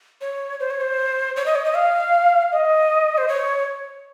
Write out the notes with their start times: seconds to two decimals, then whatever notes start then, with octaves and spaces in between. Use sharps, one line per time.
0.21 C#5
0.60 C5
0.70 C#5
0.81 C5
1.36 C#5
1.46 D#5
1.55 C#5
1.65 D#5
1.75 F5
2.52 D#5
3.18 C5
3.28 C#5